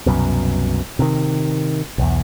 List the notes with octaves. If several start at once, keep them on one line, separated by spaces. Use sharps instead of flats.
C2 F#2 B2
C3 D#3
B1 E2